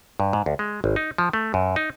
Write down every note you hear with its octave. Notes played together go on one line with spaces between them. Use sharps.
G2
G#2
D2
G#3
G#1
D#4
F3
A3
F#2
D#4